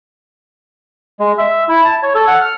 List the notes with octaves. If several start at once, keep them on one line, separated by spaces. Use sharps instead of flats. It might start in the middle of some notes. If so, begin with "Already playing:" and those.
G#3
E5
E4
A5
C#5
A4
F#5
F6